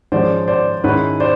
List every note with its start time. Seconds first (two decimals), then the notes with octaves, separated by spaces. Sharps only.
0.12 G#2 F3 G#3 C#4 C5 D5
0.48 C5 D5
0.84 G#2 D#3 G#3 C#4 E4 B4 C#5
1.20 C5 D5